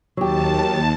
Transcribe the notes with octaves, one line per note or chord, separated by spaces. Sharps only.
D#2 F#3 G4 A5